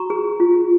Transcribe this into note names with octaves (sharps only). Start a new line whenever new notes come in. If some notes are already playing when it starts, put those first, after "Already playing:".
Already playing: F#4 A#5 C#6
G#4
F4